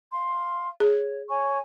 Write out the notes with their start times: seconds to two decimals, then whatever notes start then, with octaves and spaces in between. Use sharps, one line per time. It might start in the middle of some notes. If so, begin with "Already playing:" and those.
0.11 F5 C6
0.80 G#4 C#5
1.28 C#5 G#5 C#6